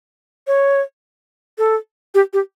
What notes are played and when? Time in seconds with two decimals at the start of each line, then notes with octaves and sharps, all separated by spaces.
0.47 C#5
1.58 A4
2.15 G4
2.33 G4